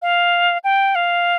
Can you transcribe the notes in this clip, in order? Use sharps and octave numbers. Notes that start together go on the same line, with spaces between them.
F5
G5
F5